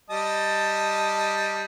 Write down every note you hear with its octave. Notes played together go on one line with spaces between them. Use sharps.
G3 D#5 A5